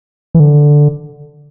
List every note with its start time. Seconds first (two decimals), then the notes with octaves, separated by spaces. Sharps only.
0.35 E3
0.40 D3